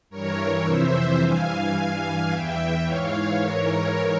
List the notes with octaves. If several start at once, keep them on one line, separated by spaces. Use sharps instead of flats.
G2 E3 A#4 C#5
F2 C3 E3 C5 E5
G2 E3 F5 G#5
G2 E3
E2 E3 E5 G5
G#2 E3 C#5 F5
G#2 E3 A#4 C#5